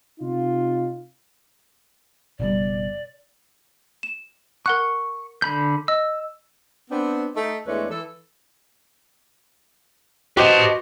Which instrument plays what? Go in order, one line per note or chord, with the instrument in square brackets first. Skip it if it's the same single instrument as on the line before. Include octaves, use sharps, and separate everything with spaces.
[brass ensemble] C3 D#4 F4
[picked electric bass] F#1 B2 G3 [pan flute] D5
[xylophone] E7
[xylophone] A#4 F#5 F#6 [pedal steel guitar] C#6
[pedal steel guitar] D3 B5 G6
[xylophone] D#5 [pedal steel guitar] E6
[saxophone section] B3 C4 D4
A3 D#4
E2 G#3 A3 D4 B4 C#5
E3 A4
[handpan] F#4 [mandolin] G4 C5 D#5 [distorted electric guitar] B4 A5